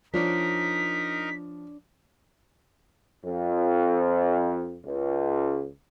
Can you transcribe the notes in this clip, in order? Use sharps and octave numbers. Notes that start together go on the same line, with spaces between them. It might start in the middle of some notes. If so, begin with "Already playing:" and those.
F3 D4 D#4 A#4 C#5 D5 B6
F2
C#2